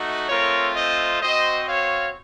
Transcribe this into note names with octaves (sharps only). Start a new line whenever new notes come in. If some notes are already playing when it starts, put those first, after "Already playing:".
Already playing: A3 D#4 F#4
A3 C4 F4 A#4 C#5
C5 D#5
C4 F#4 C5 D#5
C#5 F5